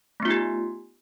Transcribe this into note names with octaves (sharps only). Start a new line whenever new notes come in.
A3 B3 D#4 F4 G4